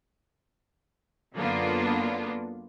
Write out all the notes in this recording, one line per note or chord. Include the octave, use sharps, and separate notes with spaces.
F#2 D3 A#3 B3 D4 F4